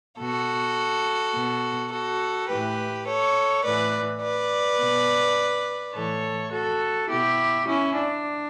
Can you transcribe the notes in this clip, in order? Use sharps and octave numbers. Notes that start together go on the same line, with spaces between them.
B2 F#4 A4
B2
F#4 A4
A2 E3 G4 B4
A4 C#5
A2 E3 B4 D5
B4 D5
B2
A2 E3 A4 C#5
F#4 A4
B2 E4 G4
C#4 E4
D4